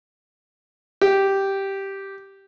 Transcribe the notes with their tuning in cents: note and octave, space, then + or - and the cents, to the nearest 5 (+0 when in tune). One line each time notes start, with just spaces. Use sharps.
G4 -5